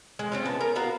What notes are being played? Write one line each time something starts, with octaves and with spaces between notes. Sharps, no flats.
G#3
C4 C#4 F4
B3 A5
A#4
B3 F#4 F5 A#5